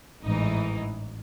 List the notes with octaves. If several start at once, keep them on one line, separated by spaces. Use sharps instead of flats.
A1 G#2 E3 D#4